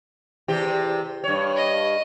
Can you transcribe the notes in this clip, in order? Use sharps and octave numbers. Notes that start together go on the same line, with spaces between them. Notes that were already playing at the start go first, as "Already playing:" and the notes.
E2 C3 G4
G2 C#5
D#5